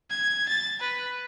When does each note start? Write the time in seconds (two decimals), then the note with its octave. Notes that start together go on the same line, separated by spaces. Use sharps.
0.10 G#6
0.49 A6
0.80 B4